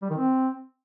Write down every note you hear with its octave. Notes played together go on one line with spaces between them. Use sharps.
G3
D#3
C4